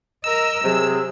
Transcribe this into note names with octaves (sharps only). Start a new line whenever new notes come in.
A#4 D#5 E6
C3 F#3 G#4